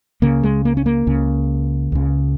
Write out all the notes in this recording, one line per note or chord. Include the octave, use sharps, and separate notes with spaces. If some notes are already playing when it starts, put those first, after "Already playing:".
C#2 C#3 A#3
G#3
A#3
C#4
A#3
C#2 C#3
C#2 C#3